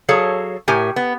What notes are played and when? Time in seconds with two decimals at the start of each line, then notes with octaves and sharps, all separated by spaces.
0.09 F#3 G#4 A4 C#5 F5
0.68 A2 G4 A#4 G#5
0.96 B3